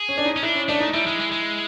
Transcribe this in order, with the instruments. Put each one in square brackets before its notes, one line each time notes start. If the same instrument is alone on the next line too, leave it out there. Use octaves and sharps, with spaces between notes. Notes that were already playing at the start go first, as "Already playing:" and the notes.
Already playing: [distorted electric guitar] G#4
[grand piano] C#4
D4
D#4
[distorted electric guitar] C#4
[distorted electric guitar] D4 [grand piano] E4
[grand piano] C#4
[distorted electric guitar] A3 [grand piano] D4
[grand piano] D#4
[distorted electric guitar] G3 [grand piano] E4
[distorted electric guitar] G#3
G#3
G#3